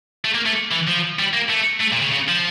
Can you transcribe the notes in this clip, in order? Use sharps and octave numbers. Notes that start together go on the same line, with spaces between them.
A3
A#3
A3
E3
F3
G3
A#3
A3
A3
A#2
C#3
C#3
F3